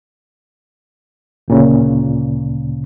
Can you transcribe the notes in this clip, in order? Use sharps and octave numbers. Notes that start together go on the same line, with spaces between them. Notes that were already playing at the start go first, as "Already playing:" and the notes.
D2 A#2 C#3